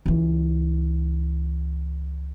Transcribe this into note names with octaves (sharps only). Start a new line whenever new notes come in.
C#2 E3